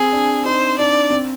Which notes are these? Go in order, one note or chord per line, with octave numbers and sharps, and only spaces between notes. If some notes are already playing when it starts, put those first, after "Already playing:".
Already playing: C4 G#4
D4
D#4 C5
D4 D5
C4